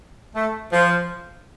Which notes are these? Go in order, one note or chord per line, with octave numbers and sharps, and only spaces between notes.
A3
F3